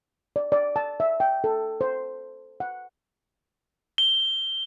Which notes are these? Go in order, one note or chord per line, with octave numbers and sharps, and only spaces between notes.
D5
D5
A5
E5
G5
A4
C5
F#5
G7